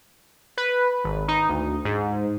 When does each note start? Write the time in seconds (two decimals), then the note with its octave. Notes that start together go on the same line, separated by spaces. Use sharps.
0.57 B4
1.04 G#1
1.28 D#4
1.49 D2
1.85 G#2